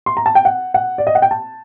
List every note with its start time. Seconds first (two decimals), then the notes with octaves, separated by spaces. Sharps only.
0.06 C6
0.17 A#5
0.26 A5
0.35 G5
0.45 F#5
0.74 F#5
0.98 D5
1.07 D#5
1.15 F#5
1.22 G5
1.31 A5